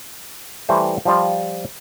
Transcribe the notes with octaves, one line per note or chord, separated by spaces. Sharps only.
E3 G3 A3 C5
F3 G3 F4